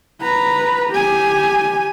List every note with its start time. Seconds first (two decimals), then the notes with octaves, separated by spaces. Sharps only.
0.22 B4 A#5
0.90 G4 G#5